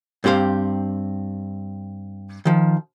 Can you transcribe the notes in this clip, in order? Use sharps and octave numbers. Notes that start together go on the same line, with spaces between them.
G2 C4 G4 C5 F5
D#3 F3